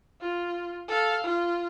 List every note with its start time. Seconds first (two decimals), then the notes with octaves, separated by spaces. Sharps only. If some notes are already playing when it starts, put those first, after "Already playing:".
0.21 F4
0.88 A4 F5
1.24 F4